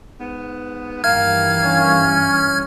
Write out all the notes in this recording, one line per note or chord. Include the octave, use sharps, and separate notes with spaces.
G#2 B3
G2 D#3 E3 A#3 F5 F6 G#6
C#4